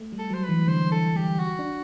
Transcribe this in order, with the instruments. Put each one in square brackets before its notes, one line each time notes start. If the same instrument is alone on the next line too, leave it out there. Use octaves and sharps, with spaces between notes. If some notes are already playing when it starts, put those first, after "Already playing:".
Already playing: [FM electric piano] A3
G3
[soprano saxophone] A4
[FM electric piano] F#3 [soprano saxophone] C5
[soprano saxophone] B4
[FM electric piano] E3
[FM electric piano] D3 [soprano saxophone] C5
[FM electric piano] E3 [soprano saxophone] A4
[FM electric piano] G3 [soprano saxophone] G4
[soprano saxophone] F#4
[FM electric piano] D4